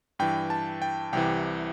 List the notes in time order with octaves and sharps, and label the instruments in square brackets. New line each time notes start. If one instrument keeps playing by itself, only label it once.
[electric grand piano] G2 E3 G5
A5
G5
C2 C3 E3 G5